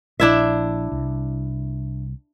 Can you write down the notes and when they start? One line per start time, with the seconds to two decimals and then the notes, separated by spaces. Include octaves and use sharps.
0.20 A#1 D4 E4 E5
0.92 C2